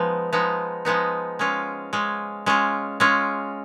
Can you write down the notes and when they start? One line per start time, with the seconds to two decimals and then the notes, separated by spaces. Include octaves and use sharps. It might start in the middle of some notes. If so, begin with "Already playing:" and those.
Already playing: F3 G#3 B3 D#4
0.33 F3 G#3 B3 D#4
0.85 F3 G#3 B3 D#4
1.39 G#3 C#4 F4
1.93 G#3 C#4 F4
2.46 G#3 C#4 F4
3.00 G#3 C#4 F4